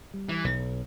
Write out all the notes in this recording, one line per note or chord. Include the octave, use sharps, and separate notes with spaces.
G3
E3
B1